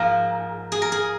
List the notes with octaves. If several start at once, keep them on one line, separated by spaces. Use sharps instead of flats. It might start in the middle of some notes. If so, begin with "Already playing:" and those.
Already playing: G#2 F3 A#3 A#4
G#4
A#4
G#4